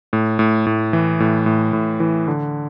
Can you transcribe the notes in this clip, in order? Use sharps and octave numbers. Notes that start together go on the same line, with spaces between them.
A2
A2
A2
E3
A2
A2
A2
E3
D3